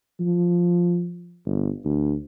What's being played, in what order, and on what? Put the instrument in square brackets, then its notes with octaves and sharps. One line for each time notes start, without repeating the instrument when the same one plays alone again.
[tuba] F3
G1
D2